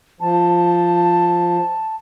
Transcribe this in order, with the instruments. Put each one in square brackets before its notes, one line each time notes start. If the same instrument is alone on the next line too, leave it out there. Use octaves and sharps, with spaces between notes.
[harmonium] F3 [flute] A5